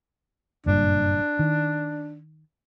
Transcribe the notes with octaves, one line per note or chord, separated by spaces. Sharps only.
F#1 G2 A#2 D4
D#3